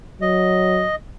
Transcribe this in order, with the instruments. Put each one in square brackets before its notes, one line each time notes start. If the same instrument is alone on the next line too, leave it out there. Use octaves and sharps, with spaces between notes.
[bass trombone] F#3 [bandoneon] D#5